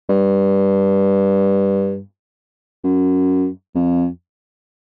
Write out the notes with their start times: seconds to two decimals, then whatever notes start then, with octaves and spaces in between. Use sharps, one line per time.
0.09 G2
2.84 F#2
3.75 F2